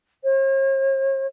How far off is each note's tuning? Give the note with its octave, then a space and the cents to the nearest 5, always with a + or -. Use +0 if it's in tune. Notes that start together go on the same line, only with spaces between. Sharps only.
C#5 -45